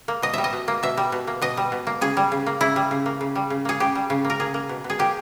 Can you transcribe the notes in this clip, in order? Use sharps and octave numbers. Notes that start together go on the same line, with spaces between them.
A#3
B2 D#5
G3 E5
D#5
B2
A#3
B2 E5
G3
B2
A#3
B2 D#5
G3
B2
A#3
C#3 G#4
G3
C#3
A#3
C#3 E4
G3
C#3
A#3
C#3
G3
C#3
A#3 G#4
C#3 G4
G3
C#3
A#3
A#4
A#3 G#4
A#3
B2
B2
G#4
A#3 G4